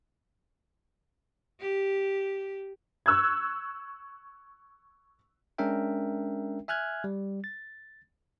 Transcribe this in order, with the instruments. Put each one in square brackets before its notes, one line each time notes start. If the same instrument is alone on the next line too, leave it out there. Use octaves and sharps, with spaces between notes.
[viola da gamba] G4
[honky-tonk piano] C#6 E6 F#6 G#6
[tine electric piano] G#3 C#4 D4 A#4 E5 G5
E5 G#5 F6 F#6 G#6
G3
A6